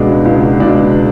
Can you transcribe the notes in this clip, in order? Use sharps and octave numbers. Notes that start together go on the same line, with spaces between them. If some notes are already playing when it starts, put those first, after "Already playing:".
Already playing: C#2 B2 G#3 D4
C#2
B2 G#3 D4